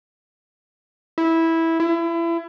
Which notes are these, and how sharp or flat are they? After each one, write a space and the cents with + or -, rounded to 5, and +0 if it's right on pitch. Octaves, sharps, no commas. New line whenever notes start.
E4 -10
E4 +30